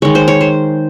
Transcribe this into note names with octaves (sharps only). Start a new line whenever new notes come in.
D#3 G#3 C#5
C5
C#5
C5